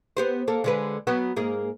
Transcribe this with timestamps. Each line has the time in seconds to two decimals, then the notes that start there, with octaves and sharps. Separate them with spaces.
0.17 B3 G4 C5
0.48 A#3 A4
0.64 D3 G#3 B4
1.07 F#3 B3 F#4
1.36 G#2 A#3 G#4